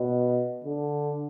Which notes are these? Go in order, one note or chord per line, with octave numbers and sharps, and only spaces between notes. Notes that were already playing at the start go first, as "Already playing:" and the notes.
Already playing: B2
D3